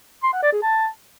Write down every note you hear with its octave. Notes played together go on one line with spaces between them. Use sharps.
C6
F#5
D5
G#4
A5